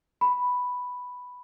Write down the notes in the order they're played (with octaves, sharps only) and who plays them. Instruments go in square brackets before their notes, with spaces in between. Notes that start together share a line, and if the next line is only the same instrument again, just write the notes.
[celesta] B5